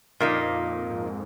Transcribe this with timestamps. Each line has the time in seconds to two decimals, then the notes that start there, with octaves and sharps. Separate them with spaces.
0.20 F2 A#2 A#3 D#4
0.82 G#2